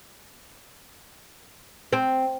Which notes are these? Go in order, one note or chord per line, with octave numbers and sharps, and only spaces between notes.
C4